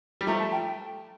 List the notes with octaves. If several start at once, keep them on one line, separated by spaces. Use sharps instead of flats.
G3
F3 A3 A#5
A5
G5